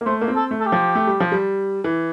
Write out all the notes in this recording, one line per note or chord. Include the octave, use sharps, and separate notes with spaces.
A#3
A3 C5
A#3
C4
A4
A3
A4
G4
F3
A3
G3
F3
G3
E3